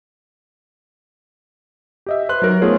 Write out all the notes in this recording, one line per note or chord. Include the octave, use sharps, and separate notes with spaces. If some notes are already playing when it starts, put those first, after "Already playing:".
G4 D#5 E5
B4 C5 C6 F#6
F#3 D#4 A#4
A3 B3 F4 G#4 C5 C#5